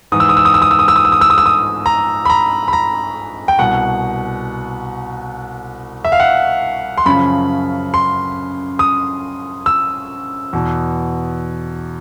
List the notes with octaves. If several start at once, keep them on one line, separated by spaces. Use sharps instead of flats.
G#2 E3 D#6
E6
D#6
E6
D#6
E6
D#6
E6
D#6
E6
D#6
E6
D#6
E6
D#6
E6
D#6
A#5
B5
A#5
B5
A#5
G5
C2 B2 F#5
E5
F5
F#5
C6
F#2 C#3 F3 B5
C6
D#6
E6
E2 B2